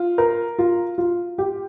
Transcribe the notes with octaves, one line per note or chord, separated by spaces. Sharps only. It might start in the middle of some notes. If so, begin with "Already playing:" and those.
Already playing: F4
A#4
F4
F4
G4